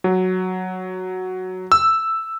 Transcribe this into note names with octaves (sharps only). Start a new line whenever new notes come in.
F#3
E6